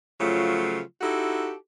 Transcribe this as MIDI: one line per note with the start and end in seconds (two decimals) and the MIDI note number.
0.20 0.81 49
0.20 0.81 53
0.20 0.81 54
0.20 0.81 57
0.20 0.81 65
1.01 1.53 63
1.01 1.53 64
1.01 1.53 66
1.01 1.53 67
1.01 1.53 69